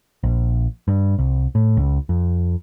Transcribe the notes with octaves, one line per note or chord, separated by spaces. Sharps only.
A#1
G2
C2
A2
C#2
F2